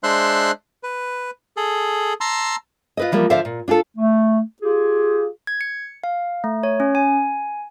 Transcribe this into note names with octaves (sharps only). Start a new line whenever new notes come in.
G#3 D4 C5 E5 C6 F#6
B4
G#4 A4
A5 A#5 C6 E6
F4 B4 D#5
E3 F3 G3 A#3
D3 F3 C5 D5 E5 F5
A#2
D4 F4 G4 A4
A3
F4 G4 G#4
G#6
C#7
F5
A3
C#5
C#4
G#5